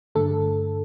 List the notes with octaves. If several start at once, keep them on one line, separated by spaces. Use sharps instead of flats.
G2 D3 A3 A4